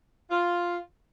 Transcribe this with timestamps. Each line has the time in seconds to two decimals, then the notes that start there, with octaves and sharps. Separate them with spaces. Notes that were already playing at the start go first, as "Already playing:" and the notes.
0.30 F4